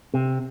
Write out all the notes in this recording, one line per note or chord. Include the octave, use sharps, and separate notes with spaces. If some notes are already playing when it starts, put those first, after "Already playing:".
C3